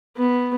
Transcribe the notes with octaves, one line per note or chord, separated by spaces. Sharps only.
B3